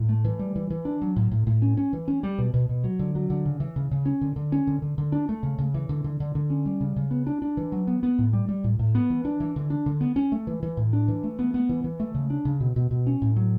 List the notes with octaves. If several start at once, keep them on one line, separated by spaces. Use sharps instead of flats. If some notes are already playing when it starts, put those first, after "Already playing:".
Already playing: A2
A3
E3
G3
E3
E3
D4
F#3
A2
A2
A2
C#4
C#4
E3
C#4
G3
B2
B2
B2
F#3
D3
F#3
D3
C#3
E3
C#3
C#3
C#4
D3
D3
C#4
D3
D3
D3
D4
A3
C#3
C#3
E3
D3
D3
D3
D3
C#4
G3
C#3
C#3
B3
D4
D4
E3
F#3
B3
B3
A2
G3
G3
A2
A2
B3
E3
D4
E3
D3
D4
D3
B3
C#4
A3
E3
E3
A2
D4
E3
A3
B3
B3
E3
E3
A3
C#3
D4
C#3
B2
B2
B2
C#4
A2
F#3